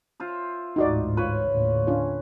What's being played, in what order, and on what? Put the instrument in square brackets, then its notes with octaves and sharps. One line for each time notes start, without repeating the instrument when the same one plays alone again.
[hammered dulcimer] F4 C5 E5
[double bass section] A1 D2 G#2 [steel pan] D#4 F#4 D5
[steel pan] F4 [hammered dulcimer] B4 C#5
[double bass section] D#2 A2 D3
[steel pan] C#4 D4 F4